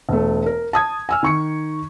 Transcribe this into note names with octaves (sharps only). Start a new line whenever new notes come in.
E1 A3
A#4
A5 D#6 G#6
G#5 E6 F6
D#3 C#6 C#7